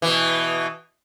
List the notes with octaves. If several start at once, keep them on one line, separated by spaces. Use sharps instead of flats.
B2 E3